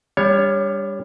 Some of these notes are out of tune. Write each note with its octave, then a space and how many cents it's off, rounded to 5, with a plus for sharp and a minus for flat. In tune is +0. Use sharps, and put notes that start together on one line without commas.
G3 +20 D4 -30 C#5 +0